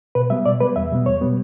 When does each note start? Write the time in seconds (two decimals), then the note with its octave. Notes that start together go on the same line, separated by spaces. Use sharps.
0.15 B2 B4
0.30 G3 B3 E5
0.46 B2 D5
0.60 G3 B3 B4
0.76 E2 E5
0.91 B2 G3 B3
1.06 E2 C#5
1.21 B2 G3 B3